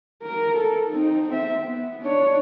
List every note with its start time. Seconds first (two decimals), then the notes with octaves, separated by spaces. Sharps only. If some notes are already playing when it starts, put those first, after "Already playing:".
0.22 A#4
0.56 A4
0.90 C4 D#4
1.28 C4 E5
1.64 B3
2.02 D4 C#5